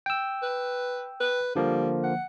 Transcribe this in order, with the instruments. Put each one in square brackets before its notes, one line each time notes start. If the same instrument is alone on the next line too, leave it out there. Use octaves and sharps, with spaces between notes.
[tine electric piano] G5 E6
[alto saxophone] B4
B4
[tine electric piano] D3 F3 A#3 [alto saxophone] G3
[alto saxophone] F#5